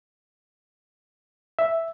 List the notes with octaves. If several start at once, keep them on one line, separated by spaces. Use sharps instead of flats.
E5